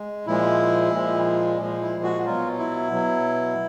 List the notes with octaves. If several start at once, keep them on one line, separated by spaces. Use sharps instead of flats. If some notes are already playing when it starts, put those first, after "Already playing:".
Already playing: G#3
A#2 F3 G#3 E4
A#2 F3 G#3
A#2 F3 G#3
E4
F#4
B2 F#3 F4
E4
B2 F#3